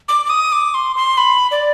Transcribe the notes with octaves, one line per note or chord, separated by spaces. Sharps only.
D6
D6
D#6
D6
C6
C6
B5
D5